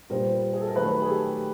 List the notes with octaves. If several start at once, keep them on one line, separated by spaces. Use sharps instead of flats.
A#2 G3 B3 A#4 C5
G#4
A4
A#4
D#3 F#3 A3 A4 B4
G#4
G4 A4